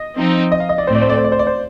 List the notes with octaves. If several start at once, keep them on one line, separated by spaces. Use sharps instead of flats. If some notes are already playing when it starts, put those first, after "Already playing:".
Already playing: D#5
F3 C4 D#4
D#5
F5
D#5
D5
A2 A3 C4 C5
D5
C5
D5
C5
D5
C5
D5
C5